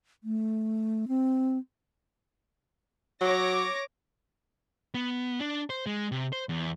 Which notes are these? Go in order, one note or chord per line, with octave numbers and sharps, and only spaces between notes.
A3
C4
F#3 C#5 D6 A#6
B3
D4
C5
G#3
C3
C5
E2